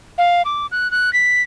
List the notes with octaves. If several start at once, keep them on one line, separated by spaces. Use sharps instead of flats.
F5
D6
F#6
F#6
B6